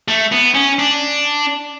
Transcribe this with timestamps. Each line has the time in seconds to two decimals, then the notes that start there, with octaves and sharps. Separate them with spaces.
0.08 A3
0.32 B3
0.55 C#4
0.79 D4